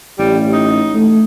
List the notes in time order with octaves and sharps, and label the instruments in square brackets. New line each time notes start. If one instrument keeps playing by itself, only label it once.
[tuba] A1 [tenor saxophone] G3
[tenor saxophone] D#4
[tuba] A3